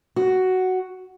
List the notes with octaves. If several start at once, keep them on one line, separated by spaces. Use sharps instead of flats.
F#4